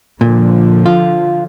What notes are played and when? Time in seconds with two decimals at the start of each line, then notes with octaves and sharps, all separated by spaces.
0.21 A#2 D3 F3
0.86 F4